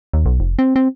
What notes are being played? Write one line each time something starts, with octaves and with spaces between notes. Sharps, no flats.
D#2
B1
F1
C4
C4